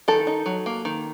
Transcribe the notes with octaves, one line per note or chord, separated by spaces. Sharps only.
D#3 A4
D#4
F#3
A#3
D#3